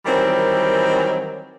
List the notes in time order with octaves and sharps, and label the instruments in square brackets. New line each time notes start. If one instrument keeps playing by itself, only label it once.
[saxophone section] D#3 E3 F#3 G3 C4 A#4